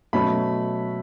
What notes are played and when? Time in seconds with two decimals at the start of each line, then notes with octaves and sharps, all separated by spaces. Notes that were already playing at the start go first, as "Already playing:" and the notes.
0.13 B2 F#3 A3 C#4 B5